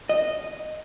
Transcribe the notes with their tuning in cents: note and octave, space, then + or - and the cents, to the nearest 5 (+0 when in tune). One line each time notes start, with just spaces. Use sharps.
D#5 -10